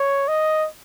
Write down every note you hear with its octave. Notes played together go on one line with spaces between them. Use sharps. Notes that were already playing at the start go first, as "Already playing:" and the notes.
Already playing: C#5
D#5